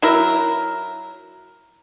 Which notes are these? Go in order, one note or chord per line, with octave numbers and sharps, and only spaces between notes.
F#3 E4 A#4